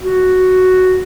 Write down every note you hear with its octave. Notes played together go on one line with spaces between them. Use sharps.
F#4